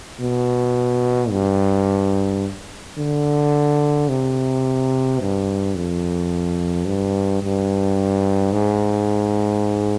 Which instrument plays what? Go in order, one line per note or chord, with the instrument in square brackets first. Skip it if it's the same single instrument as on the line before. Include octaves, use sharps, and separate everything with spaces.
[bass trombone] B2
G2
D3
C3
G2
F2
G2
G2
G#2